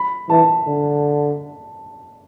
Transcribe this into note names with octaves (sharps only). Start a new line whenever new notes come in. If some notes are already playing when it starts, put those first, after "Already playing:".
Already playing: B5
E3 A5
D3